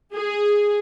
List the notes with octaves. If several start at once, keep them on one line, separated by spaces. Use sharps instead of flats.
G#4